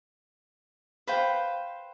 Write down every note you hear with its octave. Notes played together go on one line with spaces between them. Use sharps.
B4 C5 F5 G5